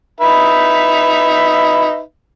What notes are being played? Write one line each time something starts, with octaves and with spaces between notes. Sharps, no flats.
D#4 B4 E5